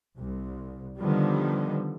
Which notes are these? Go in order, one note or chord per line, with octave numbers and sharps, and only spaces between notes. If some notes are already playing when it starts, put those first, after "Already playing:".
C2
D3 D#3 F3 G3 B3